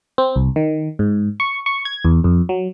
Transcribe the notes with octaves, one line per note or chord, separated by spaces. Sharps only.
C4
C2
D#3
G#2
C#6
C#6
G#6
E2
F2
F#3